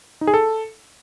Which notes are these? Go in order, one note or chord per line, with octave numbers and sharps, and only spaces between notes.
D#4
G#4
A4